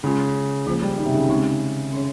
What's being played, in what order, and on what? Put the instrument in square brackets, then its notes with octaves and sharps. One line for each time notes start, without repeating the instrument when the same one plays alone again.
[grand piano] C#3 [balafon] G#3 C#4 F4
[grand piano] C#3 [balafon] F3 A#3 F4 C5
[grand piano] G3
D#3
C3
C#3
[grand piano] C#3 [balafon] G#3 C4 D#4 G4
[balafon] C#4 G#4 C#5